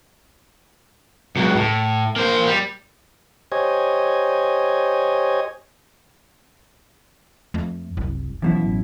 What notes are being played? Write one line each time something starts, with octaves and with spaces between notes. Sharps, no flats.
C#2 F#3
A2
A#3 C5
G3
G4 C5 C#5 D#5 G#5
F2 A3
F#1 C2
F#2 B2 E3 F3 E4
A1